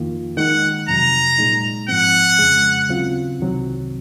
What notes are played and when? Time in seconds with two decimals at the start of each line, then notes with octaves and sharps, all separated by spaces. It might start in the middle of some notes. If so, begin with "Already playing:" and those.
Already playing: F2 D#3 A#3 F4
0.37 D#3 G#3 D#4 F#5
0.88 F2 C3 F#3 A#5
1.38 A#2 G#3 D#4
1.88 G#2 F3 C4 F#5
2.39 F2 C#3 G#3
2.89 D#2 C#3 F#3 C4 F4
3.40 C2 C3 D#3 F#3 C4